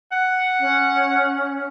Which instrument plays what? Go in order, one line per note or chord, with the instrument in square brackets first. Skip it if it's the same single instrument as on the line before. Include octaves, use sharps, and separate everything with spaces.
[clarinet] F#5
[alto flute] C#4